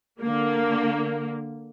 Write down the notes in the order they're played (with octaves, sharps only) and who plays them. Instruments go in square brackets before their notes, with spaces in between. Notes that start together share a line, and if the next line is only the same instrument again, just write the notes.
[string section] D3 A#3